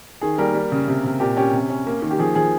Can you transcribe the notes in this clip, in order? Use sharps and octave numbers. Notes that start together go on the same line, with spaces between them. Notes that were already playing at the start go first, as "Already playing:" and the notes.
D#3 G#4
G3 A#3 A#4
G3
C#3
C3
C3
A#2 G4
C#4 G4
C3
C#4
A#3
D#3
G4
F3 G#4
F3 G#4